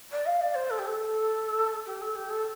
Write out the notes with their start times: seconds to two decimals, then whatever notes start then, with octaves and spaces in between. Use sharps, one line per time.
0.11 D5
0.26 F5
0.41 D5
0.55 C5
0.70 A4
0.78 G4
0.87 A4
1.86 G4
2.01 A4
2.15 G4
2.30 A4